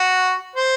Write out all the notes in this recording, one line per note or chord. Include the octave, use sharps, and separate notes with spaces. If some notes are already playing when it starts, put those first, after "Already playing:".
Already playing: F#4
C5